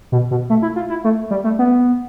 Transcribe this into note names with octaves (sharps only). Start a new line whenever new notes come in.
B2
B2
A3
E4
F4
E4
A3
G3
A3
B3